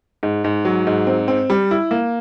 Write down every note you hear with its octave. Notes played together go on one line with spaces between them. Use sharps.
G#2
G#2
F#3
G#2
C4
C4
G3
E4
A#3